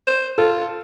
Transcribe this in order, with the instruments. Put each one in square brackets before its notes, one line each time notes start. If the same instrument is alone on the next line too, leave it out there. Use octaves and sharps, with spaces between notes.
[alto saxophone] C5
[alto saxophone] F4 [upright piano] A4